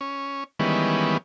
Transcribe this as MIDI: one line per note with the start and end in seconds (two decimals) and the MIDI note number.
0.01 0.44 61
0.59 1.17 51
0.59 1.17 52
0.59 1.17 55
0.59 1.17 56
0.59 1.17 59
0.59 1.17 61